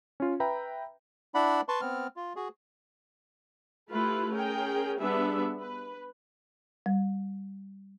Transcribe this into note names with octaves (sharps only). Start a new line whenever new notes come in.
C#4 F4
B4 E5 G5 A#5 B5
D4 E4 D5 F#5 B5
B4 A5 C6 C#6
B3 C4 F6
F4
F#4 G#4
A3 E4 F4 G4 B4
C#4 G#4 A#4 G5
G3 B3 D4 G#4 E5
B4
G3